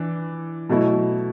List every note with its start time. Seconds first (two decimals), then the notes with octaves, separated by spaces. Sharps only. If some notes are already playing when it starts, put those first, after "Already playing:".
Already playing: E3 D4
0.69 B2 F#3 A3 E4